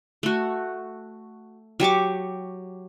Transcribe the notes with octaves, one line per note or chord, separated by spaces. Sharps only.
A3 F#4
F#3 G4 C#6 D6